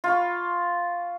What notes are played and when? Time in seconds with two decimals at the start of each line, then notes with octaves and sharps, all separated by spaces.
0.04 F4 B5 C#6